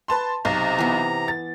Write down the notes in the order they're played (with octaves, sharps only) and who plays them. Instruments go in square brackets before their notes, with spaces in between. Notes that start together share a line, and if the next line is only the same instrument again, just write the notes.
[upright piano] B4 A5 C6
[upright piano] B1 [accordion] C3 A#5 [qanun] C5
[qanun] E3 B3
[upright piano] A6